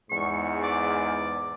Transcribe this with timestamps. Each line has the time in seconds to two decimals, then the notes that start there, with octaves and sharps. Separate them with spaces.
0.10 E2 G#2 G#3 C#6
0.63 D5